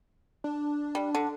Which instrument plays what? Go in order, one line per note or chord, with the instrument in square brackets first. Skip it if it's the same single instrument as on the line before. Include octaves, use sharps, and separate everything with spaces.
[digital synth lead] D4
[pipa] G3
D3